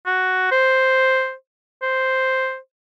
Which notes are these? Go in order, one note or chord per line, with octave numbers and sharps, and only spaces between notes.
F#4
C5
C5